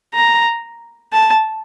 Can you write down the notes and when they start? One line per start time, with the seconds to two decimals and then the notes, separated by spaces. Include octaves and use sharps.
0.14 A#5
1.13 A5